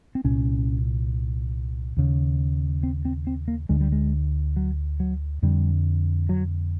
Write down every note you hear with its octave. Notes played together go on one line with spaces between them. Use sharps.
C4
C2 A#2 C#4
D#2 C#3
C4
C4
C4
A#3
D2 D3 G#3
G3
G#3
F#3
F#3
F2 D3 G3
F#3